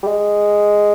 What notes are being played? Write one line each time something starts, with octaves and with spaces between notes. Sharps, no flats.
G3
G#3